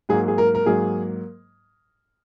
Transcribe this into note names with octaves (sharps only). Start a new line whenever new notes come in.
G#2 F#3 A#3 G#4
G#4
A#4
A#4
G#2 F#3 A#3 G#4